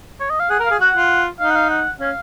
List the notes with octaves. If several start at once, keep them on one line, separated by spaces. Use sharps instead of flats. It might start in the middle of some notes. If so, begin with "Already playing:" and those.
C#5
D#5
F5
G#4 F#5
A#4
F5
G#4
F#4 F#5
F4
D#4 F5
F#5
F5
F#5
C#4 F5